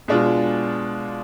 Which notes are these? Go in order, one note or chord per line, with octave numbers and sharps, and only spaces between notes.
B2 G#3 D4 F4